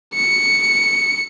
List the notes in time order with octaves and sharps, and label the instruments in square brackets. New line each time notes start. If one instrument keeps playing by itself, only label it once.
[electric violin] C#7